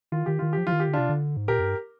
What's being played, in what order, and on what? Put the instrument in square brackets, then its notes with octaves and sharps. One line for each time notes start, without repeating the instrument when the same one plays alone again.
[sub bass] D#3 [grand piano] F4
[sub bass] D#3 [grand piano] G4
[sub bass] D#3 [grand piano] F4
[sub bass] F3 [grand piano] G4
[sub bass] F3 [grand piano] F4
[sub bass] D#3
[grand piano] G4
[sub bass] D3
[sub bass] C3 [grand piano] D4 F4
[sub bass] D3
G#2
[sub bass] A#2 [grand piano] G4 A#4
[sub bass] F2
G2